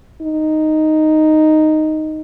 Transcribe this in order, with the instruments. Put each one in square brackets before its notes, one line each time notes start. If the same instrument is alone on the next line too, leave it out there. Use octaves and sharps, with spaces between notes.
[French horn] D#4